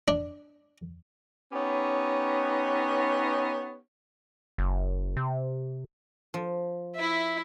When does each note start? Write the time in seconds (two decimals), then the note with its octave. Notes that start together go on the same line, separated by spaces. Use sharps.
0.08 D4
1.53 B3 C#4 D#4 G4 B4 C#5
4.58 F#1
5.17 C3
6.34 F3
6.95 E4 E5